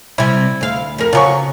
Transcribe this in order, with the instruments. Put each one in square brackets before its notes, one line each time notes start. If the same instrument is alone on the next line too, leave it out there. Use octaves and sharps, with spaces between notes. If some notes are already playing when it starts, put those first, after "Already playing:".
[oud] C3 G3 [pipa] E4
[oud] D2 F5
F2 A#4
[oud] C#3 [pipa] F3 F#3 C#6